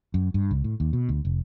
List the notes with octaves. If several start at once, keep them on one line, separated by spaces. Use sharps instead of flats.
F#2
G2
C#2
A2
D#2
B2
D2
F1